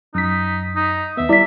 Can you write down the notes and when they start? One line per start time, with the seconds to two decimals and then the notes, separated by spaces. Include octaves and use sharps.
0.14 F#2 D#4 B6
0.76 D#4
1.17 D#2 B3 E5
1.29 G3 E4 D5 B6